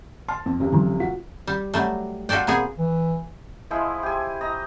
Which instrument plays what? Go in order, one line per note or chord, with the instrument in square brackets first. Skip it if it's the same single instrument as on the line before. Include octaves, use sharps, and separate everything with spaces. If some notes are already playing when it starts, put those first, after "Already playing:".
[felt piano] A5 F6 [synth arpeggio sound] C6
[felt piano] F2
F1 C#2 C3
[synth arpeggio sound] D3 E3 F#3
[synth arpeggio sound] F4 [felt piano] F#4
[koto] G3
F#3 G3 A3
F4 F#4 A4 D5 G5
A#2 B3 C4 G#4
[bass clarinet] E3
[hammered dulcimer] F3 G#3 E4 C5
G4 G#5
D#5 A#5